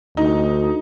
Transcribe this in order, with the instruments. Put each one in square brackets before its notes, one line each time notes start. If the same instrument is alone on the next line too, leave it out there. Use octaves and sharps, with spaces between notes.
[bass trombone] D2 [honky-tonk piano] D#4